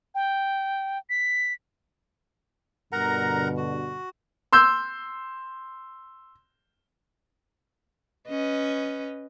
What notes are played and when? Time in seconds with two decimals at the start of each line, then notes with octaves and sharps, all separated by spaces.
0.15 G5
1.10 B6
2.92 G2 B2 D3 A#4 F#5 A#5
3.57 F#4
4.53 C6 E6 G6
8.28 C#4 B4 D#5